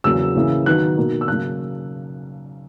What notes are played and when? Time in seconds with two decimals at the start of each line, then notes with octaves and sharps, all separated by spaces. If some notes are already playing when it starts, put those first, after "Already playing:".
0.04 E2 C#3 F#3 A#3 E6
0.36 C#3 E3 A#3
0.66 D#3 F#3 B3 D#4 F#6
0.97 B2 A#3 D#4
1.21 E6
1.28 C#3 F#3 A#3 F#6